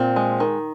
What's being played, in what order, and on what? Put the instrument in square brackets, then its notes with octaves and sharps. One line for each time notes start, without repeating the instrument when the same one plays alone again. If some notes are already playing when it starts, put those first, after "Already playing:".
Already playing: [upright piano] A#2 [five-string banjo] C4
[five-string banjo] G#3
D#3